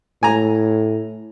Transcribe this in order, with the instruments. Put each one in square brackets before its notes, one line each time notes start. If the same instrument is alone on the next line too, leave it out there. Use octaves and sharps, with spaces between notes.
[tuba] A2 [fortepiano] G#5 A#5